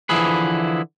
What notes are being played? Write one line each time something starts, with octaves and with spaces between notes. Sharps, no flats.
D3 E3 F3 E4 G#4 B4